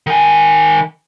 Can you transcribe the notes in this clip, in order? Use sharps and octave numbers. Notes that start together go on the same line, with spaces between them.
D#3 G#5